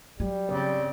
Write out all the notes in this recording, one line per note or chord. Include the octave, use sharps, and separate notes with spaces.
F#3 G3
C#3 C4 D5